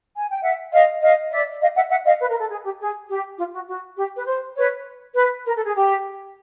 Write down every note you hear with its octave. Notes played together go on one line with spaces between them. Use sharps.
G#5
G5
E5 F#5
D#5 F5
D#5 F5
D5 E5
D#5 F5
E5 F#5
E5 F#5
D#5 F5
B4
A#4
A4
G#4
G4
G#4
G4
F4
F#4
F#4
G4
B4
C5
B4 C#5
B4
A#4
A4
G#4
G4